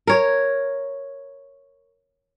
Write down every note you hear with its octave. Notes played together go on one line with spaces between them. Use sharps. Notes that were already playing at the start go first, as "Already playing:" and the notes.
A#4 C#5